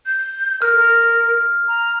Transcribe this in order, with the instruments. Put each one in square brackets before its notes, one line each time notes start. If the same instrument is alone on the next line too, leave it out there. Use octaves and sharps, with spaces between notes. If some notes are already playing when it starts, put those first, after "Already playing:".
[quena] G6
[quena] A#4 [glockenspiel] F6
[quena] A#4
A#5